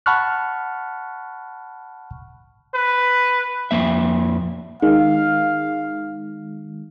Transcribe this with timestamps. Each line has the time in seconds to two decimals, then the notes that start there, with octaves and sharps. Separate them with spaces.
0.06 F#5 A5 B5 C#6 F6 F#6
2.74 B4
3.71 F2 A#3 E5
4.82 D#3 G#3 F5